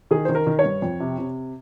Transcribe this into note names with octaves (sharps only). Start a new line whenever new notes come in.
D#3 G#4
D#3 C5
A#4
D#3
C#5
G2
F2
C3
C3